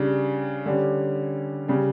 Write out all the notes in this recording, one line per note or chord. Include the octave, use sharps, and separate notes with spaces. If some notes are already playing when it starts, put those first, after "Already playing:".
Already playing: C#3 G3 D4 G4
D3 G3 C#4
C#3 G3